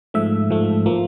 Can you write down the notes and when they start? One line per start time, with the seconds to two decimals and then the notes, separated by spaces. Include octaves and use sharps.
0.14 G#2 F3 A3 E5
0.50 G#2 F3 A3
0.86 F3 A#3